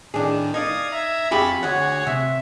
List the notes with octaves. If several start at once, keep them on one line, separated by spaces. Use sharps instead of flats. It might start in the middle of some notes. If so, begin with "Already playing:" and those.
A2 D#3 D4 G#4
D#4 D5 F5 D#6 G#6
E5 A#5 G#6
F2 F4 G4 G#4 B5 C#6 A6
D2 F#4 G#4 C#5 F#5
C3 E5